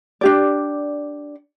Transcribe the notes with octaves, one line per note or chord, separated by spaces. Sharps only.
D4 G4 D5